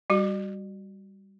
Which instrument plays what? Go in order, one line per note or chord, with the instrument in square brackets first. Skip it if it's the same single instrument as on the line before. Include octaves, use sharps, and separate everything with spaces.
[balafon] G3 F#4